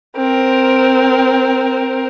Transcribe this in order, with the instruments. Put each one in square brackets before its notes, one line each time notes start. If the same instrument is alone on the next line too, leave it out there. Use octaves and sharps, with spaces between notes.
[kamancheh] C4 A#4